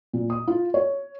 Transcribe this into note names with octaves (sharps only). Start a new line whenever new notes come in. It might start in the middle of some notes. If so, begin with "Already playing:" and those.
A#2
D#6
F4
C#5